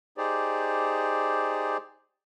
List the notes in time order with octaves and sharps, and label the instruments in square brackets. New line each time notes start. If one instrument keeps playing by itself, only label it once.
[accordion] D#4 G4 G#4 C5 D5